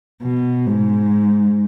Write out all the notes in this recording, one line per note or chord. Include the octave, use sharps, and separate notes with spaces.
B2
G#2